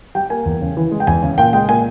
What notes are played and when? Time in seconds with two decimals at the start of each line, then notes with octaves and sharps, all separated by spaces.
0.15 G3 G5
0.30 A#3 G#5
0.46 E2
0.61 C#3
0.77 E3
0.92 G#3
1.00 G5
1.07 E2 G#5
1.23 C#3
1.38 A#2 G5
1.53 G#3 G5
1.69 A#2 G#5